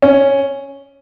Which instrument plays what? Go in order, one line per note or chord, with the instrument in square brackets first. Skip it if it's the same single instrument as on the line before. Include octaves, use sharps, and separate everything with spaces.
[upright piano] C#4